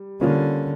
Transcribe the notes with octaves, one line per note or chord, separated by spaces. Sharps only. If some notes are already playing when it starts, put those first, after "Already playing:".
Already playing: G3
D3 G3 A#3 C#4 F4